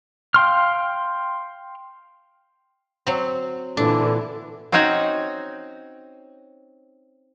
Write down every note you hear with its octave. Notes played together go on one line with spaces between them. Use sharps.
F5 G5 C6 F6
F#3 C4
A#2 D3 E3 D4
C4 C#4 D#4 F#4 C#5